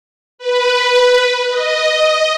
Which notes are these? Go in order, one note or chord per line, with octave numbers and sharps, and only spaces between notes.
B4
D#5